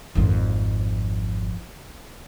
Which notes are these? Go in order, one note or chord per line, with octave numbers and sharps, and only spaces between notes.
G#1 F2